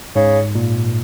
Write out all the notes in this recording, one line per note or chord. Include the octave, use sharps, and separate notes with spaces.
G#2 C#3
A#2